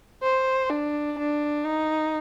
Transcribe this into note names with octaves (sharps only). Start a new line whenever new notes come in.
C5
D4
D4
D#4